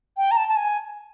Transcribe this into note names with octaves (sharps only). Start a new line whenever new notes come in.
G5
A#5
A5
A5
G#5